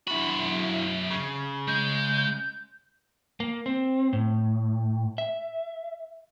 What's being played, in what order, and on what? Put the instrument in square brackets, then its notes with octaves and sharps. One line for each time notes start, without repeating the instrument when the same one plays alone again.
[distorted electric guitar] F#2 B5 [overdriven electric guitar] E4 F#4
[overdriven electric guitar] C#3
[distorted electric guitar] G#3 [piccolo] G6
[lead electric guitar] A#3
C4
A2
E5